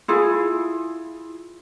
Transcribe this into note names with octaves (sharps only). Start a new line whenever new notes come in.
E4 F4 G#4